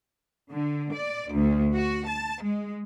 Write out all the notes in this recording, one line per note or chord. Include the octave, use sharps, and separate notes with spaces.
D3
D5
D2
F#4
A5
G#3